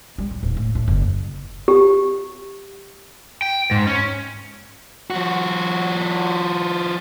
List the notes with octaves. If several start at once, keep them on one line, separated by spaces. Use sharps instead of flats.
G3
A2
D#1
A2
A2
F#1
G4
G5
G#2
C#4
F3 F#4